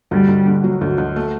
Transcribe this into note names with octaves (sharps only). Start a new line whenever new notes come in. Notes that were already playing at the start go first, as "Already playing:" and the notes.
D2 G3
D2
D3
F#3
D2
D2
A3